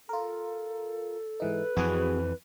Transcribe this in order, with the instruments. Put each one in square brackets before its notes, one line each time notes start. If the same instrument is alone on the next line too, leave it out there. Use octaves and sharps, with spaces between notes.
[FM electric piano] F4 A#4 [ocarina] A4
[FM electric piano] G#2 E3 D#4 [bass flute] B4
[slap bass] F2 E3 [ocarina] C4 [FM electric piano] F#4 G#4